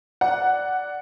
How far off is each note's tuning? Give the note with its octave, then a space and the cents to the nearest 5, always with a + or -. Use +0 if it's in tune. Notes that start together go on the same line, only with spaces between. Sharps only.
D5 -5 F#5 +0